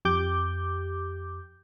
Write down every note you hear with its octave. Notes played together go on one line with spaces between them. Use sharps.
F2 G4 D6 G6